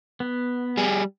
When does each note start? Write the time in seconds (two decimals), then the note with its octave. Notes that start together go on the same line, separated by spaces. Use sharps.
0.20 B3
0.77 G3 G#4